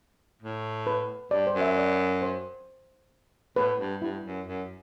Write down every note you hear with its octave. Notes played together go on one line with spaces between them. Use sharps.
A2
B4
G2 D5
C5
F#2
E5
D5
C5
A2 B4
G2
G2 E4
F#2
F#2